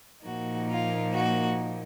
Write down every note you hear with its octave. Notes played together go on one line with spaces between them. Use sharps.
A#2 F3 A#3 D#4 F#4
F4
F#4